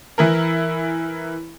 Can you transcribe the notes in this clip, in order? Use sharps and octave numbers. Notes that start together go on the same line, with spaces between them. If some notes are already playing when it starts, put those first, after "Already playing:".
E3 E4 A#4